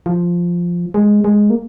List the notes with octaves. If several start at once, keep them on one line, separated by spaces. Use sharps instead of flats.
F3
G#3
G#3
A#3